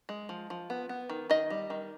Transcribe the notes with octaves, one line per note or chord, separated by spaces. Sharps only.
G#3
F3
F3
B3
B3
D#3
D#3 D#5
G3
D#3